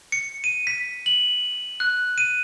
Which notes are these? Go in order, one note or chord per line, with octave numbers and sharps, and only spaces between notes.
C#7
D#7
B6
F#7
F#6
D#7